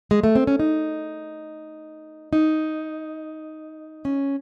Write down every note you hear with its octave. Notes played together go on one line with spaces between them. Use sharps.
G#3
A3
C4
C#4
D#4
D#4
C#4